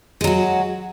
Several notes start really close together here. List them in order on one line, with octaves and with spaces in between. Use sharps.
G#3 F#3 F#4